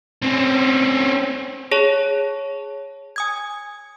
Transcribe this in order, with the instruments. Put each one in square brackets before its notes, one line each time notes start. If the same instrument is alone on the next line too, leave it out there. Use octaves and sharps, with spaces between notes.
[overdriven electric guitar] C4 C#4
[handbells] G#4 C#5 A5
G#5 D#6 G#6